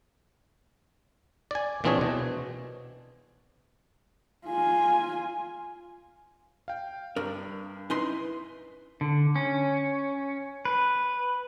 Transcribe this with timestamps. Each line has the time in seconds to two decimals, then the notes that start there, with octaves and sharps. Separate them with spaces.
1.51 D5 G#5
1.84 A#2 E3 C4 D4 G#4 C#5
2.01 B2
4.47 F4 G#5
6.68 F5 G5
7.16 G2 D4 A#4
7.90 C#4 D#4 E4 B4 C6
9.01 D3
9.36 C#4
10.65 B4